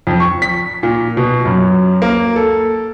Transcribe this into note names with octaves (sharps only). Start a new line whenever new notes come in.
F2
C#6
B6
A#2
B2
F#2
A#3
A4